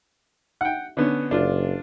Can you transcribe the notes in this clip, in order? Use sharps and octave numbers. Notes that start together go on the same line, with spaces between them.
F#5 G5
D3 B3 C#4
F#1 D4 F4